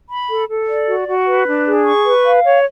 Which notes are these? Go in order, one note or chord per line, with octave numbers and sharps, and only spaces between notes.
B5
A4
A4
D5
F#4
F#4
B4
D4
G#4
C#6
B4
F5
C#5